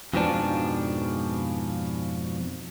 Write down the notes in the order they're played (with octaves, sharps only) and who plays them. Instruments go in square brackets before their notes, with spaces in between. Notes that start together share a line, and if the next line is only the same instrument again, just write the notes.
[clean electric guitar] F2 G#2 B2 F3 D4